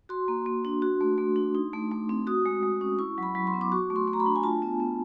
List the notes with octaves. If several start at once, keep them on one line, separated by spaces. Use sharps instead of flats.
F#4 C6
A#3
A#3
D4
F#4
A3
A3
D4
D#4
A3
A3
C4
F#4 D#6
G#3
G#3
C#4
E4 C#6
F#3 B5
F#3
C6
B3
D6
F#4 C#6
A3
C6
A3
A#5
B5
D4
G#5
F4 A5
B3
B3